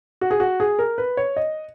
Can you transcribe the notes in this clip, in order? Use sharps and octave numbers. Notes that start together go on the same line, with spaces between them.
F#4
G#4
F#4
G#4
A#4
B4
C#5
D#5